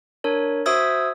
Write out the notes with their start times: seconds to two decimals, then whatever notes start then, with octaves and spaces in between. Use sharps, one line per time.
0.24 D4 A#4 C#5
0.66 F#4 C5 E5 D#6 E6 G#6